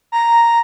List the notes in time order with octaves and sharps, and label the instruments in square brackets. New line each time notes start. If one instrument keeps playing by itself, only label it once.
[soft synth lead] A#5